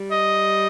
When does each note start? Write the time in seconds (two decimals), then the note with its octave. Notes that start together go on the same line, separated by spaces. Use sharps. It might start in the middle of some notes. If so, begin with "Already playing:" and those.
Already playing: G3
0.11 D#5